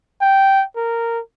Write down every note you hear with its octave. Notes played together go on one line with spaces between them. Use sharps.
G5
A#4